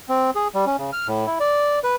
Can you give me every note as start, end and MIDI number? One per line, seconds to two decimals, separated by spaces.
0.09 0.31 60
0.35 0.48 68
0.54 0.65 55
0.66 0.76 61
0.78 0.91 49
0.93 1.07 89
1.08 1.27 45
1.27 1.38 64
1.40 1.79 74
1.84 1.96 71